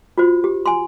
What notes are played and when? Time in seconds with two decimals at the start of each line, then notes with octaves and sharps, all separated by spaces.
0.18 F4 F#4 C5
0.44 G4
0.66 G#5 C6